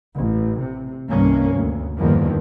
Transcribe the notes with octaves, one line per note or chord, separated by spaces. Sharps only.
A1
C3
C2 G2 C3 D#3 A#3 C#4
D2
E2 G2 D3 D#3 F3 A#3